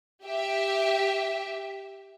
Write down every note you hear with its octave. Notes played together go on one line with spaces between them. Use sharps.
G4 E5